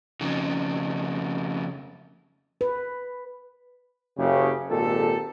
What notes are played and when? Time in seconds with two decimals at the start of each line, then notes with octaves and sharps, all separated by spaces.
0.21 F2 C#3
2.61 B4
4.18 F#1 C#3 G4
4.70 G#1 A#2 G4 A4